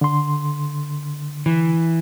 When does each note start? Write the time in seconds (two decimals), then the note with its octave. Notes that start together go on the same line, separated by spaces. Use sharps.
0.01 D3 C6
1.46 E3